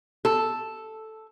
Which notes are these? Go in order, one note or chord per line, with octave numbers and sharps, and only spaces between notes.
A4